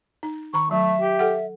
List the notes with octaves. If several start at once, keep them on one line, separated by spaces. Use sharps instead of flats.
D#4
D#3 A#5 B5 C#6
F#3 A3 E5
G4
A4 F#5